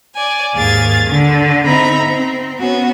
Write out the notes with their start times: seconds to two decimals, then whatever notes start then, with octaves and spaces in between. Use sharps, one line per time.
0.16 D5 G#5
0.54 D#2 G#2 G#4 F5 G#6 A6
1.08 D3
1.66 C4 D#4 E5 A#5 B5
2.05 C4
2.60 B3 C#4 F#4